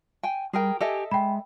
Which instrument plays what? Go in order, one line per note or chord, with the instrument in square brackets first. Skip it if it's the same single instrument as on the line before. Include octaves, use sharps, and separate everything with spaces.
[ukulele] G5 G#5
[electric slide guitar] G3 [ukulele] G#4 A#4 G5
[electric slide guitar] G4 G#5 [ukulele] A4 D#5 E5
[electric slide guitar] G#3 [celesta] G5 B5